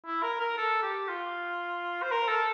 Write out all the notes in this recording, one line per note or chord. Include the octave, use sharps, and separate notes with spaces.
E4
A#4
A#4
A4
G4
F4
C5
A#4
A4